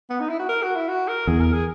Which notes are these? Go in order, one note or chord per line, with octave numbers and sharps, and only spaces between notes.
B3
D#4
E4
F#4
A#4
F#4
E4
F#4
A#4
E2 G#4
A#4
G#4